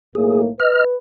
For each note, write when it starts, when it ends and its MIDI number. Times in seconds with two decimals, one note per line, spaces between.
0.15 0.49 35
0.15 0.49 45
0.15 0.49 58
0.15 0.42 68
0.60 0.96 71
0.60 0.84 75
0.60 0.84 89